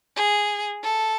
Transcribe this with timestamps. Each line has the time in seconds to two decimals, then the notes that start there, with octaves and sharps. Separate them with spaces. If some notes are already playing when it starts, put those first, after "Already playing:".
0.16 G#4
0.83 A4